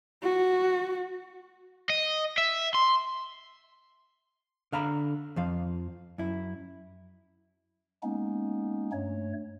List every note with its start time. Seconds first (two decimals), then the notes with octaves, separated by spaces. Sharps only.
0.23 F#4
1.90 D#5
2.38 E5
2.75 C6
4.72 D3 F5 A#5 B5
5.36 F2 F3 F5
6.18 F#2 E4
8.03 G#3 A#3 B3 C#4 D#4
8.93 G2 A3 C#5